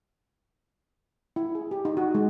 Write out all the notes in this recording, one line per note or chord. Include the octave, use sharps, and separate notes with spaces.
E4
G#4
G4
D#4
F#4
G#3